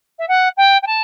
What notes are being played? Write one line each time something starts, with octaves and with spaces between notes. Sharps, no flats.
E5
F#5
G5
G5
A5